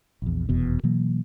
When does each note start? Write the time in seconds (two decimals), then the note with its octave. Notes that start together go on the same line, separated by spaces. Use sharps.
0.22 A#1 E2
0.49 F1 E2 B2
0.83 B2 E3 F#3 A#3